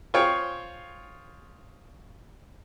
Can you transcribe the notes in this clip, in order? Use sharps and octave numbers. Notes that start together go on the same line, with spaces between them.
F4 G#4 C5 C#5 G5 C#6